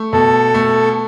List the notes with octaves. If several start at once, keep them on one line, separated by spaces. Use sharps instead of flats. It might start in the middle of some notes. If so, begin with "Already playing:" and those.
Already playing: A3
B2 A4
A3